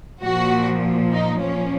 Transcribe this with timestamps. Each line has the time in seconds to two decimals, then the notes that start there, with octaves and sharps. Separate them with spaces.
0.23 A#2 F3 F#4
1.12 D#4
1.41 A#2 F3 C#4